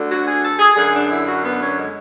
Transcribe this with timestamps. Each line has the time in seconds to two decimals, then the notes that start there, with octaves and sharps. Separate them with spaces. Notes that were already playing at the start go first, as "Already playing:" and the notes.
Already playing: D2 D3
0.09 F#4
0.26 G#4
0.43 A4
0.59 G#4
0.76 F#2 D3 G#4
0.93 D4
1.10 E4
1.27 F#4
1.43 B3
1.59 C#4
1.77 G#3